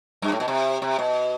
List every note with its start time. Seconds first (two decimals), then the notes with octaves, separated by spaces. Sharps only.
0.22 G2
0.32 A2
0.40 B2
0.48 C3
0.82 C3
0.99 B2